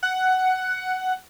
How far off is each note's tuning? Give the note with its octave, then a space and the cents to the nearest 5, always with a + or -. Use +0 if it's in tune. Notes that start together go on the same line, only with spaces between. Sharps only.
F#5 +10